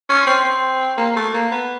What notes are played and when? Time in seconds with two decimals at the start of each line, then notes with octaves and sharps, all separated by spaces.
0.09 C#4
0.26 C4
0.44 C4
0.97 A#3
1.16 A3
1.34 A#3
1.51 B3